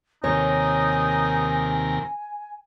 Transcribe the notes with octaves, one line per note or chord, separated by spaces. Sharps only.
D#2 C3 D#4 A#4 C#5 G#5